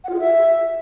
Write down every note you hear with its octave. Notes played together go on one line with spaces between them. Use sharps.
F#5
F4
G#4
E5